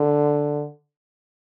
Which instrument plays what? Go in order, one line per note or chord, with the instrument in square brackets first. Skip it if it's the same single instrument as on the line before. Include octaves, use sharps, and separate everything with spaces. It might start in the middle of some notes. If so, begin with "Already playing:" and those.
Already playing: [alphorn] D3